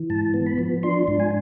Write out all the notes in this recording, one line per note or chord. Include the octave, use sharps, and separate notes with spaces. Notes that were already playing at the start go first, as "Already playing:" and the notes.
Already playing: E3
G#2 A5
B3
B5
F3
D4 C6
G#2
G#5